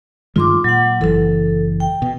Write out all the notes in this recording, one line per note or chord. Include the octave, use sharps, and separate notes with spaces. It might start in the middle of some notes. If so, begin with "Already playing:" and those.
G2 D#3 G#3 F4 C6 D6
A#2 F#3 F#5
F#1 C#2 E3 A4
G5
B2